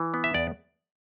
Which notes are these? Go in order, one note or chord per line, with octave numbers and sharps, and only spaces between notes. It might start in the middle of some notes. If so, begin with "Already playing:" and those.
Already playing: E3
B3
E5
E2 D5